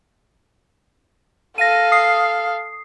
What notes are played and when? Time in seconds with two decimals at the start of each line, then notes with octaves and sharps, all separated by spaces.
1.58 A4 F5 A#6 D#7
1.92 D#6 C7